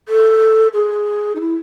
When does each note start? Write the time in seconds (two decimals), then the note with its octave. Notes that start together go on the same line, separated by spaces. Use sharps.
0.09 A4
0.74 G#4
1.35 D#4
1.40 E4